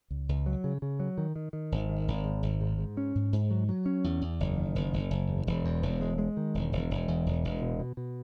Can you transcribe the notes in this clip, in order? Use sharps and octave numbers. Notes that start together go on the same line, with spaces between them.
C#2
C#2
F#3
C#3
C#3
F#3
D#3
D#3
D#3
G#1
D#3
G#1
G#2
G#1
G#2
G#2
C#4
G#2
G#2
F#3
F#3
C#4
E2
E2
F#1
D#3
F#1
F#1
F#1
E2
E1
E2
E1
G#3
G#3
D#3
E1
E1
E1
E2
E1
E1
B2
B2
B2